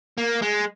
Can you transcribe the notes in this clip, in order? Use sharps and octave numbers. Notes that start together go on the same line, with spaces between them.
A#3
G#3